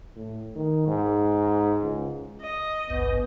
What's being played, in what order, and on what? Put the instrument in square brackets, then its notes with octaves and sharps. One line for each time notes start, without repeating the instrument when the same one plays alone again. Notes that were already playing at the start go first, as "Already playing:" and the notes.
[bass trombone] A2
D#3
G#2
C#2
[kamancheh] D#5
[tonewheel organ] G#1 C#2 G2 [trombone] B3